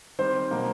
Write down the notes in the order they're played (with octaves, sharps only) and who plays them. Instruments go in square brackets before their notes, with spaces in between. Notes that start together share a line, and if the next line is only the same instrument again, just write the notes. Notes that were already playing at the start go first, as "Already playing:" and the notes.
[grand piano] D#3 G3 C4 C5 C6
B2 F#3 A#3